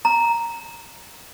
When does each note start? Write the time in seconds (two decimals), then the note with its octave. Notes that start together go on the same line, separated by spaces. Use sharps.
0.05 A#5